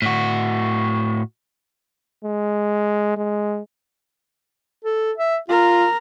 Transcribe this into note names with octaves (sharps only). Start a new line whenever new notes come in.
A2 F#4
G#3
G#3
A4
E5
F4 A#4